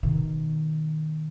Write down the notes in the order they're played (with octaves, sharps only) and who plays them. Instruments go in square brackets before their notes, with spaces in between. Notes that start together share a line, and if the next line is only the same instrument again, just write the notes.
[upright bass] B2 D#3